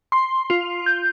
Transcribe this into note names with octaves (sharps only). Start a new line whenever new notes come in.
C6
F4
G6